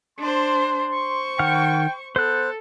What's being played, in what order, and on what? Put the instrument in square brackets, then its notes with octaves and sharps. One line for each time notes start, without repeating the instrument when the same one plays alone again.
[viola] D4 C5 [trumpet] C6
[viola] C5 C#6
[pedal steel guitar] D#3 F#5 F6 [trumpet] G5
[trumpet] B3 [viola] A4 [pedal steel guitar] C5 F#6